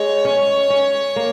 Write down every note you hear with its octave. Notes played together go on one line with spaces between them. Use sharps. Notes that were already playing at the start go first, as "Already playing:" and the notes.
Already playing: G#3 C#5
C#4
C#4
A#3